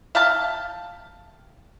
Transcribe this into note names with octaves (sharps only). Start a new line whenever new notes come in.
E5 F5 G5 A5